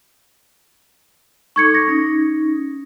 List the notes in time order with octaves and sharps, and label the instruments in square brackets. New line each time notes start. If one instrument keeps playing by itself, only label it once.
[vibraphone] D#4 A4 D6 [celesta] C#6 G#6 C#7
[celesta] A#6
[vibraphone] C#4 D#4